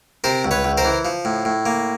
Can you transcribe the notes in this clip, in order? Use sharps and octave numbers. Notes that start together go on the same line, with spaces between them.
C3 A#4 C5
C#2
B4 C#5
C#2
A#4 C5
E3
F3
A2
A2
A#3